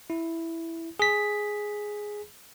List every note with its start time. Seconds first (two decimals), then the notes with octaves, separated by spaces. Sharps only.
0.10 E4
1.00 G#4 B6